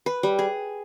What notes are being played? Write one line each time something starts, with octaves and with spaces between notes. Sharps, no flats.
B4
G3
G#4